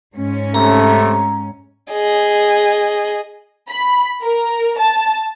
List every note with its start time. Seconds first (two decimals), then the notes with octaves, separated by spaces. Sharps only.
0.15 G#2 C#4
0.54 C3 A3 A#5
1.92 G#4 D#5
3.69 B5
4.22 A#4
4.79 A5